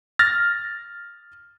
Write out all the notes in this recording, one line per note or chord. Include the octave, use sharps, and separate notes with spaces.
F6 A6 A#6